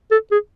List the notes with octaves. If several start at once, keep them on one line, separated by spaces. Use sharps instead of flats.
A4
G#4